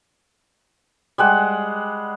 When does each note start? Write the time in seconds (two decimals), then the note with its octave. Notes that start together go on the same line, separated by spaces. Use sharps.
1.18 G3 G#3 F#5